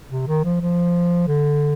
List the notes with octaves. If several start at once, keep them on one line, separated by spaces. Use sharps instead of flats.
C3
D#3
F3
F3
D3